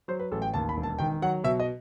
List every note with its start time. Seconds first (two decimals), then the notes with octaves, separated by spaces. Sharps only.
0.08 F#3 C5
0.19 B4
0.31 A1 A4
0.42 G5
0.54 D#2 A5
0.69 B5
0.77 E1
0.83 A5
0.99 D#3 G5
1.22 F#3 F#5
1.44 B2 E5
1.60 D#5